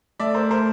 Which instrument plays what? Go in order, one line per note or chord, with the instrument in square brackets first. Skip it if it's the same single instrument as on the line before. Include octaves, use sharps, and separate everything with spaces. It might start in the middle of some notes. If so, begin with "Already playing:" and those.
[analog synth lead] A3 [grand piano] D5 E5
[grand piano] A#4 C5
A#4 C5